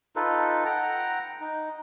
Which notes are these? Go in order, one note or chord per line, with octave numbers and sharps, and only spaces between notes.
D#4 F4 A4 B4
F#5 G5 A#5
D#4